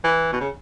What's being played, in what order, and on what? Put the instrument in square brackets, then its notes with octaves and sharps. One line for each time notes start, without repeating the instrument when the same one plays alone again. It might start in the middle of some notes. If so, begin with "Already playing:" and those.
[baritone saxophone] E3
B2
C#3